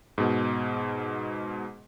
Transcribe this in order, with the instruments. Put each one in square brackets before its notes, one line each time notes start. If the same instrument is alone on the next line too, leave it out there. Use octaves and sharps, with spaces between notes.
[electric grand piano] G#2 B2